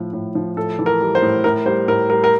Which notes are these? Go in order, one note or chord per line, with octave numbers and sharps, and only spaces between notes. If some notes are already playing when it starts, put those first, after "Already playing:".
Already playing: A2 F3
A2
F3
A2 A4
E3
A#4
G3
C5
A2
A2 A#4
G3 C5
A2 A#4
G3 A#4
A#4